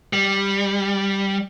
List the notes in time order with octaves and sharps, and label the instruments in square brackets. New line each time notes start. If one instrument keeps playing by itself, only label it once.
[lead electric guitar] G3